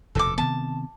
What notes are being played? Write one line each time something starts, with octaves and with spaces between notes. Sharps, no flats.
F1 D#2 B2 A4 D6
C3 D#3 B3 A5